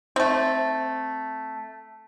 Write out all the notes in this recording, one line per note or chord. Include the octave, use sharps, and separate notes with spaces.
A3 C4